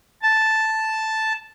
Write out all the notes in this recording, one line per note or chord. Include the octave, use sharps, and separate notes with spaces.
A5